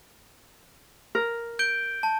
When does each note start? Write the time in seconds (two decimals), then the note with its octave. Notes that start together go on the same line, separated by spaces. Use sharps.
1.15 A#4
1.59 G6 D7 G7
2.03 A5